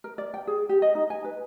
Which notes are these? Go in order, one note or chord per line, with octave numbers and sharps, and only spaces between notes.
A#4
D5
G5
G#4
G4
D#5
D#4
G#5
B4